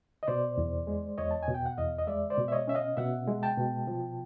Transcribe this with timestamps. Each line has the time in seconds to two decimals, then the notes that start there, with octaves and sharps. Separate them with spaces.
0.23 D#5
0.28 B2 C5 D5
0.58 E2
0.87 G#3
1.18 E2 C#5 D#5
1.31 A5
1.43 B2 G#5
1.54 G5
1.66 F#5
1.77 E2 D#5 F5
1.98 D#5
2.07 G#3 D5 E5
2.30 C5 D5
2.38 B2
2.48 E5
2.52 C#5 D#5
2.68 C#4 E5
2.75 D#5 F5
2.97 B2 E5 F#5
3.27 G#3
3.43 G5 A5
3.58 B2
3.87 F3